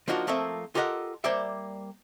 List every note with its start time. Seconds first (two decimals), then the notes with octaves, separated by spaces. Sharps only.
0.08 F3 A#3 D4 D#4 F4 F#4
0.27 F3 A3 A#3 C4 E5
0.75 F4 G4 A4 A#4 D#5 F#5
1.24 G3 A#3 C5 D5 E5